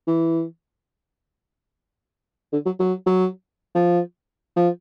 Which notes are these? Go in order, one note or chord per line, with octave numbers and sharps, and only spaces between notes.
E3
D3
F#3
F#3
F#3
F3
F3